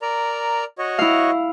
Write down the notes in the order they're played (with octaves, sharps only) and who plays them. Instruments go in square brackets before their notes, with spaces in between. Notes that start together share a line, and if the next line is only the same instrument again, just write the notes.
[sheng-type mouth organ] A#4 D5 A#5
F#4 C#5 D#5
[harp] E4 F5